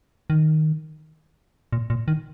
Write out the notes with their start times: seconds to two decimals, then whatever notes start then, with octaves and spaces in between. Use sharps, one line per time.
0.30 D#3
1.73 A#2
1.90 A#2
2.08 D#3